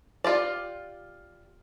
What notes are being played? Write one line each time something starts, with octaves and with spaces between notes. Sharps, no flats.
F4 G4 D5